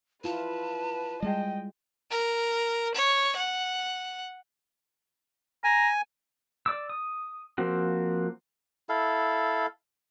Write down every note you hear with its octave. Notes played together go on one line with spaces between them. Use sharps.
E4 F4 B4 A5
G3 G#3 D#5 G5
A#4
C#5
F#5
G#5 A#5
D5 D6 E6
D#6
F3 A#3 C4 F#4
E4 A4 F5